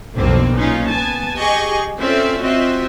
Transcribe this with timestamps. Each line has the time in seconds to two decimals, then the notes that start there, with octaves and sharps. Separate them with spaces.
0.17 B1 F2 B2 D3 A#3 C4
0.58 A#2 B3 C#4 D#4 F4
0.90 B3 G#5 A5
1.37 G4 G#4 D#5 C#6
1.98 C4 C#4 F4 A4 D5 E5
2.43 C4 F4 F#4 D#5 E5